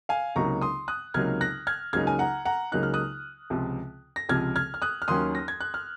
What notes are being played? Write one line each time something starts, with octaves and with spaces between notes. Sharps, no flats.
F5 G#5
C#2 C3 F#3 A#3 D#4 A#5 C#6
C6 D#6
D#6 F#6
C#2 C3 F#3 A#3 D#4 F6 G#6
F#6 A#6
F6 G#6
C#2 C#3 F#3 A#3 D#4 F6 G#6
G#5
F#5 A#5
F#5 A#5
C#2 C#3 F#3 A#3 D#4 F#6
F6
D#6 F#6
C#2 C3 F3
A#6
C#2 C3 F3 F6 G#6
F6 G#6
F6
D#6 F#6
F6
D#2 D#3 F#3 C#4 C6 D#6
A#6
G#6
F#6
F6